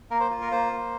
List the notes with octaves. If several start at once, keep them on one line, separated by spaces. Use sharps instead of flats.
A#3 A#4
C5
F4
A#4
A#3 C5
A#3